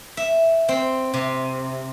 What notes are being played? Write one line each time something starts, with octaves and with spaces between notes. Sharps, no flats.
E5
C4
C3